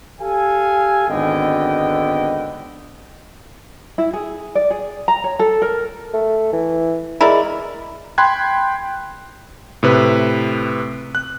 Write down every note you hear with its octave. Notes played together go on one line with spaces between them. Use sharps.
G4 A4 F5 G#5
G#1 D3 B3 D#5 G5
E4
G#4
D5
G#4
A#5
C#5
A4
A#4
A3
E3
G#3 E4 A#4 D5
G5 B5 C6 F#6 G#6
A2 C3 B4
F#6